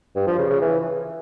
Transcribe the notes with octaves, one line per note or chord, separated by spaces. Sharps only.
G2
F3
C#3
C#3
E3